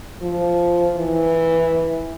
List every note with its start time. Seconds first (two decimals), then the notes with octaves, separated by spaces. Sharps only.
0.22 F3
0.96 E3